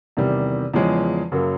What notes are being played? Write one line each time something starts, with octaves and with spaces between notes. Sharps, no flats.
E2 C3 D#3 G3
E2 C#3 F3 G#3 C#4
F#2 C#3 F#3 A#3